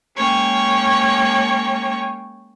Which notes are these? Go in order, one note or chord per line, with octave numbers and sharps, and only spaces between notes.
G#3 A#3 C#4 C#5 G5